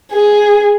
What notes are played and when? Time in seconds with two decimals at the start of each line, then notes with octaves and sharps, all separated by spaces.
0.11 G#4